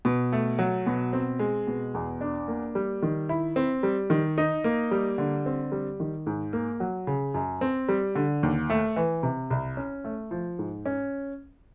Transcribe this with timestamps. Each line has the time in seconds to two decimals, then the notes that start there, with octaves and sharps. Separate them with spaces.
0.05 B2
0.32 A3
0.59 F#3
0.87 B2
1.13 C4
1.39 G#3
1.67 B2
1.94 E2
2.21 D4
2.48 A#3
2.75 G3
3.03 D#3
3.29 E4
3.56 C4
3.83 G3
4.10 D#3
4.38 D#4
4.64 A#3
4.91 G3
5.18 D3
5.46 C4
5.72 G3
6.00 D#3
6.27 G#2
6.53 A#3
6.80 F#3
7.07 C#3
7.34 F#2
7.61 C4
7.89 G3
8.15 D3
8.43 D#2
8.70 A3
8.96 E3
9.23 C3
9.50 C2
9.77 C#4
10.05 A3
10.31 F3
10.59 G#2
10.86 C#4